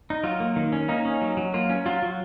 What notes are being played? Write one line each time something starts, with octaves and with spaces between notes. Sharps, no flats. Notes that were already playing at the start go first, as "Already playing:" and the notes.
D#4
F#3 F4
A#3
D#3
C#4
A#3 D#4
C#4
F#3
F#3
A#3 F4
C#4
F#3 F4
F#3